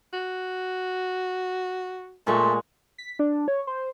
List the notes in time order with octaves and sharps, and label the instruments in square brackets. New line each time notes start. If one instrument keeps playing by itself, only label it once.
[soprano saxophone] F#4
[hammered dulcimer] A#2 G#3 C#6 [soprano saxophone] A3
[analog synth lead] B6
D4
C#5
C5